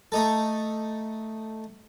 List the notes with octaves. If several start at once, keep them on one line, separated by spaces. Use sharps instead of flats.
A3 D#4 A4